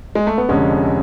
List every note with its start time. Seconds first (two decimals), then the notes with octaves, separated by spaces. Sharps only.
0.15 G#3
0.27 A3
0.38 B3
0.49 F1 F2 D3 G#3 C#4